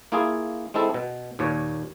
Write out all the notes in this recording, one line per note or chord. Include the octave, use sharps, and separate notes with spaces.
A#3 E4 F4 G#4
G#3 C4 E4 A4
B2
D#2 A#2 C#5